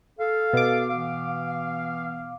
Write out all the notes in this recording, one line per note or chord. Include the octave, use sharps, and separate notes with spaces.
A4 F5
B2 D6
E3 B3 F5